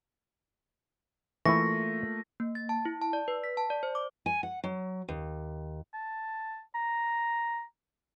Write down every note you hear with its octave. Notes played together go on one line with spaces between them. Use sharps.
E3 A3 A#3 E4 F4 C#6 A#6
A#3
A6
A5
E4
A5
D5
B4
B6
A5
D5
C5
D6
G#5
F#5
F#3
D#2
A5
A#5